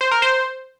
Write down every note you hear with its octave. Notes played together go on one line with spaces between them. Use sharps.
C5
A#4
C5